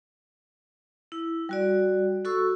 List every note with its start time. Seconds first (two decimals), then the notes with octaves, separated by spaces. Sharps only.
1.12 E4
1.49 G3 F#4 D5
2.25 F#4 A4 C#6 E6